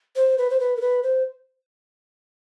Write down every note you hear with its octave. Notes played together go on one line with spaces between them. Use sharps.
C5
B4
C5
B4
A#4
B4
C5